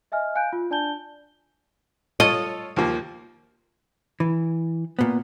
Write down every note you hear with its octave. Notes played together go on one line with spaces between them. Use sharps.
D#5 E5 G#5 F6
F5 G#5 F#6 G6 D7
F4
D4 D5 G#5 A5 G6 G7
F4 A4 C#5 D#5
D#2 F3 A#3
E3
A#2 B3